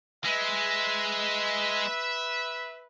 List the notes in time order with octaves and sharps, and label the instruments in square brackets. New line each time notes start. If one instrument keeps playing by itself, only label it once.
[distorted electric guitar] G#3 [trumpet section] B4 E5